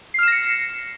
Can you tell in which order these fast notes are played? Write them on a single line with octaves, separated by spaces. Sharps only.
C7 F6 E7 A#6 C#7